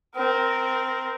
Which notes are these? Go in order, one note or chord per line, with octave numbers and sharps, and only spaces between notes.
C4 A#4